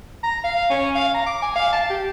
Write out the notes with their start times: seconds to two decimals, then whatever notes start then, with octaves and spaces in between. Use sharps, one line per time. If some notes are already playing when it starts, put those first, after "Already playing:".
0.23 A#5
0.44 F5
0.70 C#4
0.95 F5
1.14 A#5
1.27 D6
1.42 G#5
1.56 F5
1.73 A5
1.90 G4